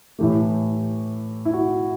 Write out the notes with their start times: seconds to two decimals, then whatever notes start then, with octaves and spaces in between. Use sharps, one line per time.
0.19 A2 E3 A3 G4
1.45 E4
1.53 F#4